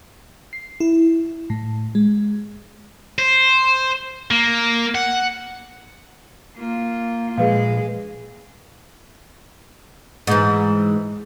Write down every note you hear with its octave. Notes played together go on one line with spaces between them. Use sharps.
C7
E4
A2
G#3
C5
A#3
F#5
A#3 F4
A#2 F3 G#3 G#4 B4 F5
G#2 E3